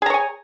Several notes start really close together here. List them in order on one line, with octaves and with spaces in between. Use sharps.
G#4 A#5 C#5 G#5